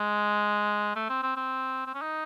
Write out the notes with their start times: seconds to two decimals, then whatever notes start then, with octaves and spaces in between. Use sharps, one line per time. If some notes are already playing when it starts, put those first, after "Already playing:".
Already playing: G#3
0.96 A3
1.09 C4
1.23 C4
1.36 C4
1.86 C4
1.94 C#4
2.02 D#4